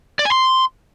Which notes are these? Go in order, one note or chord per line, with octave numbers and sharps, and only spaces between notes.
D5
G#5
C6